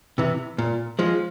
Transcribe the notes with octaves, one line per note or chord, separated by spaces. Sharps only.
C3 E3
A#2
F3 G#3